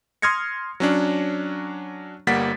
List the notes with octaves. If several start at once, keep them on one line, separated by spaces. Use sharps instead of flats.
C6 D#6 F6 G#6 A#6 C#7
F#3 C#4 D4
G1 G3 A#3 F#5 A6 B6